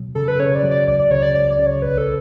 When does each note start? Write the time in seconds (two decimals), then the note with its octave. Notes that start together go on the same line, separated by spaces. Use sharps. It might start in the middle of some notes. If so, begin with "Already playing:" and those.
Already playing: B2 F#3
0.15 C#3 A4
0.28 B4
0.39 C#3 C#5
0.55 D5
0.63 F#3
0.71 D5
0.88 C#2 D5
0.99 D5
1.11 C#3 C#5
1.23 D5
1.34 C#2 D5
1.50 D5
1.59 C#3
1.66 C#5
1.82 B1 B4
1.98 A4